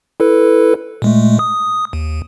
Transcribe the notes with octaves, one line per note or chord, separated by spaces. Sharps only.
E4 A4 B4
A#2 G#3 A3
D#6
D#2